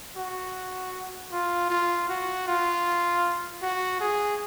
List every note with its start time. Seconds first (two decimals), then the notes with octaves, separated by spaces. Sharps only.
0.17 F#4
1.32 F4
1.70 F4
2.09 F#4
2.48 F4
3.62 F#4
4.01 G#4